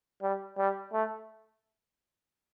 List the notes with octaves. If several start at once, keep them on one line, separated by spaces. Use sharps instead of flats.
G3
G3
A3